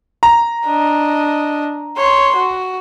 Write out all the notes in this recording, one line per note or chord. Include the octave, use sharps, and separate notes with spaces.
A#5
D4 D#5
C#5 C6
F#4